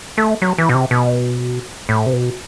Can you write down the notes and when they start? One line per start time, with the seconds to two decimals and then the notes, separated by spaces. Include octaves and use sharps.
0.17 A3
0.42 F#3
0.58 E3
0.69 B2
0.74 C3
0.91 B2
1.89 A2
2.06 C3
2.13 B2